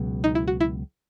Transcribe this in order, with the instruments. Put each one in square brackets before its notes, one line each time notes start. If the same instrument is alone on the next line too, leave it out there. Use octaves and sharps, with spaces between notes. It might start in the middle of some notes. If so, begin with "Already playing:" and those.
Already playing: [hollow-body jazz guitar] C#2 B2 F#3
[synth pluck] D#4
E4
F#4
E4